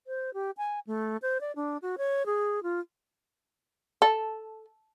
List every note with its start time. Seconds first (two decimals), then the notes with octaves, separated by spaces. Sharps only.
0.07 C5
0.34 G4
0.57 G#5
0.87 A3
1.22 C5
1.41 D5
1.56 D4
1.82 F#4
1.98 C#5
2.26 G#4
2.63 F4
4.02 A4